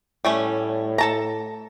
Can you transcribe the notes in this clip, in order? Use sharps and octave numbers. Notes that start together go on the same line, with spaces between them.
A2 G3 A3 C#4
A4 A5 A#5